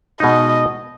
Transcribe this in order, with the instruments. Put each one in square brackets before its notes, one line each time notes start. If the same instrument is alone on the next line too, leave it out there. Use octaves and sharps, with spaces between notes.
[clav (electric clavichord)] B2 G#3 D#4 [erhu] D#5